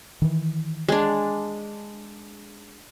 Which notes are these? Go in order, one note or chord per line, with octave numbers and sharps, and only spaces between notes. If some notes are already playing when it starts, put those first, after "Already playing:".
D#3 E3
G#3 D4